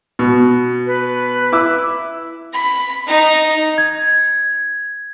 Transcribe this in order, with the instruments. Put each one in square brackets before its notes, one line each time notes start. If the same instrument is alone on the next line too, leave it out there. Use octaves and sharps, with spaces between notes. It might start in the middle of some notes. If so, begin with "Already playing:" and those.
[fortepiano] B2
[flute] B4
[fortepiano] E4 D6 E6
[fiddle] B5
D#4
[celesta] G#6